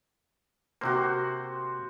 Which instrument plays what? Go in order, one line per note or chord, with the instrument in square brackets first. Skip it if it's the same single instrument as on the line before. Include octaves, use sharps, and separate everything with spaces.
[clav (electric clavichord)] C3 A#3 [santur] F#4 C5